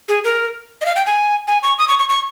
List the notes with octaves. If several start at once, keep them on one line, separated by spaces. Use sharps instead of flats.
G#4
A#4
D#5
F5
G5
G#5
G#5
C#6
D#6
C#6
C#6
C#6